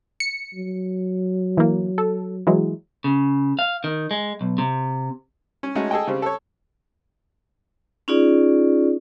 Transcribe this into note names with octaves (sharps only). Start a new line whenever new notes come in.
C#7
F#3
E3 A#3
A4
E3 F#3 G#3
C#3
F5
D#3
G#3
B1
C3
C#4
G#3 A3 C#4 D#4 F#4
G#4 A4 D#5 G5
C#3 G3 C4
A4 C#5
C#4 D#4 F4 G#4 D5